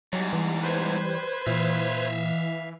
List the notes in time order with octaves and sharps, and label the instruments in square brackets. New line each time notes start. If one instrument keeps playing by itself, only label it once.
[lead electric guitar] E2 G#2 [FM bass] F#3 [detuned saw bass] G3
[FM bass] E3
[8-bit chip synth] B4 C5 G#6
[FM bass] A#2 [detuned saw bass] E3 [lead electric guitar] E5 F5